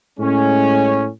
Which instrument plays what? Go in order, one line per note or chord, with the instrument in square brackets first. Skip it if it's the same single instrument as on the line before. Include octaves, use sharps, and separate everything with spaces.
[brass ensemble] A2 G#3 C#4